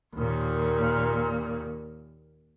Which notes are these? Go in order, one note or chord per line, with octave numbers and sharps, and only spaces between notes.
D#2 A#2